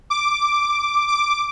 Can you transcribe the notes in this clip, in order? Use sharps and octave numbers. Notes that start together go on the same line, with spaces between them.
D6
D6